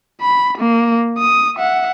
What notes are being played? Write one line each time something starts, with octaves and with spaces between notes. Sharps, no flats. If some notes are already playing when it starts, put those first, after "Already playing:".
B5
A#3
D#6
E5 F#5